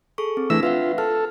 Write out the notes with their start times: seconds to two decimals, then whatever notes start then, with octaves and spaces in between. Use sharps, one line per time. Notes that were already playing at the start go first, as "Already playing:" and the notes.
0.18 G#4 A4 C#6
0.37 C4
0.50 E3 A3 D4 E6 A#6 B6
0.63 F4 B4 E5 F#5
0.98 A4 F6